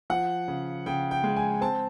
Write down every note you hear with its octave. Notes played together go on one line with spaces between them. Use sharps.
F3 F#5
C#3
C#3 G5
G5
G#3
G#5
C4 A5